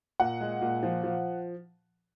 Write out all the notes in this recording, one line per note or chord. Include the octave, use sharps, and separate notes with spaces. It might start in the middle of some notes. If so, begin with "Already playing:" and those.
A#2 F#5
G#3
A#2
F3
F3